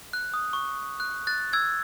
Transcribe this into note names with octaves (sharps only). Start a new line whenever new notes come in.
F#6
D#6
C#6
F#6
F#6 A6
E6 G#6